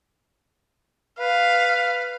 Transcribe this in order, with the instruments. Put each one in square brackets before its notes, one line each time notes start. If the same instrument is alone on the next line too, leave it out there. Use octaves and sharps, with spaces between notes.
[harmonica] B4 [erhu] F5